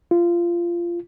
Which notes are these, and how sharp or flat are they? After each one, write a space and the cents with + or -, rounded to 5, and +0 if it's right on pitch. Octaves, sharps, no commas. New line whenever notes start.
F4 -20